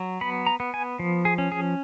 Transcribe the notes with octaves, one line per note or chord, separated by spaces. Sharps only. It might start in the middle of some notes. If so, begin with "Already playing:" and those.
Already playing: F#3
B3 B5
A#5
B3
G#5
F3
G#4
C#4
G#4